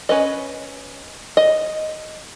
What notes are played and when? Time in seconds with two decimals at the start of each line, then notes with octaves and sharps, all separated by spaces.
0.09 C#4 B4 D#5
1.37 D#5